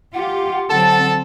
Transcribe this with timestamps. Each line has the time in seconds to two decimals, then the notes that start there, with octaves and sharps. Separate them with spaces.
0.14 F4 G4 F#5
0.70 D3 F#3 C4 A4 A5